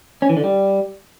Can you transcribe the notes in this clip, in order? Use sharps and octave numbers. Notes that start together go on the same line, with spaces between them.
C#4
E3
D3
G3